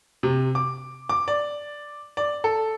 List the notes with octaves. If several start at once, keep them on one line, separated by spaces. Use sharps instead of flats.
C3
D6
D6
D5
D5
A4